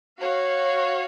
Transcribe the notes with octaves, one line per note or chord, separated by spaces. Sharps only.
F#4 C#5 F5